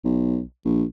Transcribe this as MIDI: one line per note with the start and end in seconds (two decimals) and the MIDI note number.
0.05 0.42 35
0.65 0.84 34